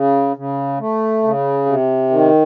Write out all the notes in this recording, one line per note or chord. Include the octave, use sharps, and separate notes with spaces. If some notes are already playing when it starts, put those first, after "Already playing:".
Already playing: C#3
C#3
A3
C#3
C3
D#3